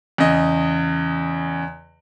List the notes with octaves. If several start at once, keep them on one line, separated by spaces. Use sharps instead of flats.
E2 C#3 D#5